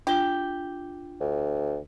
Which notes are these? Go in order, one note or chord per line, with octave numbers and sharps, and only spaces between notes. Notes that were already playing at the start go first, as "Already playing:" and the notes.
D4 F4 G4 G7
D2